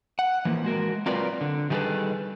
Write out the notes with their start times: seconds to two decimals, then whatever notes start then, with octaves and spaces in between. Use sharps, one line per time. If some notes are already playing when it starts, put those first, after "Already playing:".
0.19 F#5
0.45 E3 F3 A#3
0.64 G#3 F#4 A#4
1.06 F#3 C4 F4 A#4 B4 D5
1.41 D3
1.70 D#3 G3 A3 G#4 A4 B4